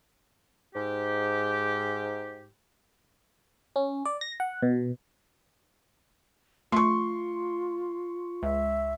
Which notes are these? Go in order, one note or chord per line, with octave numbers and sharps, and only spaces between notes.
G#2 G4
C#4
D5
A#6
F#5
B2
A3 F4 C6 C#6
C#2 E5